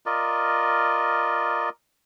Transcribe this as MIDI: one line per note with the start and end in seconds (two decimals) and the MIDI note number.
0.06 1.69 65
0.06 1.69 70
0.06 1.69 74
0.06 1.69 75